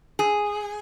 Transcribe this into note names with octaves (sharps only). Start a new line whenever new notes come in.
G#4